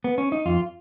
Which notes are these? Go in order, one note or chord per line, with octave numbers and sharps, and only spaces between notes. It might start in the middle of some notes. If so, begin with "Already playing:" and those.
B3
C#4
D#4
F2 F4